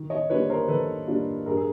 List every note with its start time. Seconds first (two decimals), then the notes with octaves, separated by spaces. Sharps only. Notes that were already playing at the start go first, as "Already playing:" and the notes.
Already playing: D#3
0.10 C#5 D#5
0.30 G3 A#3 D4 F4 B4 C#5
0.50 A#4 C5
0.68 D#3 A4 B4
1.07 G3 A#3 D4 F4
1.46 G2 G#4 A#4
1.57 G#4